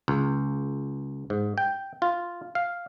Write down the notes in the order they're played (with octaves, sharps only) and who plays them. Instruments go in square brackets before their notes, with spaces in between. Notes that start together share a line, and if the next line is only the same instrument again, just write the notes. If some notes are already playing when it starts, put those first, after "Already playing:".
[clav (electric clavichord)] C#2
G#2
G5
F4
F5